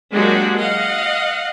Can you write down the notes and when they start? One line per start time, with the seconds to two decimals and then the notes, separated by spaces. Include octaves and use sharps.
0.13 F#3 G#3 A#3 D4 F#4 G4
0.58 D#5 F5 F#5